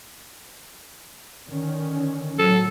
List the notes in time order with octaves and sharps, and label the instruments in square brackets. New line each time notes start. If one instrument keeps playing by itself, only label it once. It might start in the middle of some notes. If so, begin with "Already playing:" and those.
[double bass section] D3 D#3 C#4
[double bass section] A2 F#3 [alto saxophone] A4